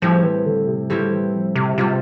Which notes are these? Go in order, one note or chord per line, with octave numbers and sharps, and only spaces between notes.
A2 F3 G3 C4 E4 G4
E3
D3
C3
A2 D3 G3 C4 E4 G4
E3
F3
C3
C3 G3 C4 F4